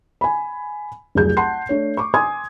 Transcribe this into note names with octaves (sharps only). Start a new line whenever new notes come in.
G#5 B5
F1 C2 F#3 G#4 G6
F#5 A5 C6 C7
A3 D4 C#5
C#6 D6
G#5 C6 D#6 G#6